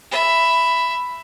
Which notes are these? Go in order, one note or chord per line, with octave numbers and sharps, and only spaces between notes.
E5 B5